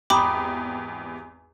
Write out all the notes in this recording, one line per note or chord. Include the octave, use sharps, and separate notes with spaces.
G#1 E2 G4 G5 A#5 B5 D6 D#6